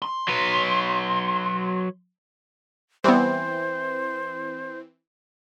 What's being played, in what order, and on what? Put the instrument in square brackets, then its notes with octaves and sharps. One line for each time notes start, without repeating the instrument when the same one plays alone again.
[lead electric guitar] C6
[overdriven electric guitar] F#3 B4
[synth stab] E3 C4 [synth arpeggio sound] G3 B3 [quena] C5